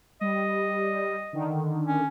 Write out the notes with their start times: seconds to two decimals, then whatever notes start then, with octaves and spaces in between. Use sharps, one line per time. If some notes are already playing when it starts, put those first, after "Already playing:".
0.21 G3 D#5
1.33 D3 D#3
1.87 C#4